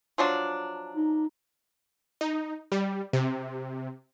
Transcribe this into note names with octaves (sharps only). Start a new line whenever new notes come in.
F3 F#3 D4
D#4
D#4
G3
C3